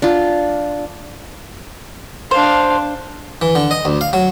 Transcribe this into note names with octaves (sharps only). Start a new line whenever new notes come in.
D4 F4
D4 C5 F5
E3
D3
D#5
D2
F5
F#3